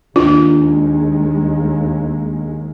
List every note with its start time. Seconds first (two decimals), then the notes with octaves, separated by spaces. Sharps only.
0.16 D#2 G#3 D4 F4